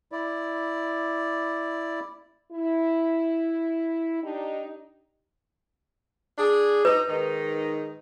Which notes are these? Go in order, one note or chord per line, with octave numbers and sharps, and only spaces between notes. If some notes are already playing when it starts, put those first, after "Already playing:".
E4 D5
E4
D4 D#4 G4
D4 G#4
D#4 B4
G#2 D#3 D#4